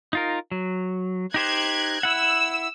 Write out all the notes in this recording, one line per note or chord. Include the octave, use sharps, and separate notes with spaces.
D#4 F4 A#4
F#3
D#4 G4 C5 F#6 G#6
E4 F#5 E6